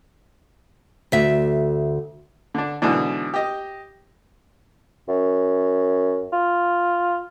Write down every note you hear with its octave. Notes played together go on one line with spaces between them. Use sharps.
D2 E5
D3 D4
G#2 B2 D3 E3 D4
G4 D#5
F#2
F4